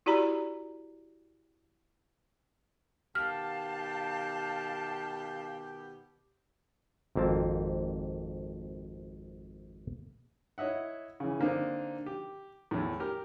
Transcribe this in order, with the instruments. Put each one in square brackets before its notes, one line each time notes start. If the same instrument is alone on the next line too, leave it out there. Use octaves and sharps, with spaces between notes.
[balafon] E4 F#4 G4 D5 A#5 B5
[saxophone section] B2 D#3 G4 [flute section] F5 A5 [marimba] F6
[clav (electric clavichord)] G#1 F2 A#3 C4 A5
[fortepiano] E4 C#5 D#5 E5 F#5
C#3 E3
D3 A#3 C4 D4 D#4
G4
E2 A2
G4 A#4